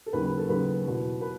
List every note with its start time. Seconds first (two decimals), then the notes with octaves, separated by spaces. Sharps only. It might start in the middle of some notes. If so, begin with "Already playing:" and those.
0.06 A4
0.13 D#2 C#3 F#3 B4
0.26 B4
0.38 A4
0.49 D#2 C#3 F#3 B4
0.86 E2 B2 F#3
1.21 B4